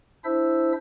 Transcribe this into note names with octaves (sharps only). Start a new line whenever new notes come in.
D4 E4 C5 E5 E6